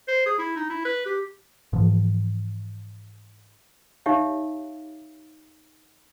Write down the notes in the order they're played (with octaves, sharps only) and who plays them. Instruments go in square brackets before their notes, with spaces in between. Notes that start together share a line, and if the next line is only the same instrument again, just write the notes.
[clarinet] C5
G#4
E4
D#4
E4
B4
G4
[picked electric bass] G#2 E3 F3
[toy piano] D#4 G4 C#5 E5 F5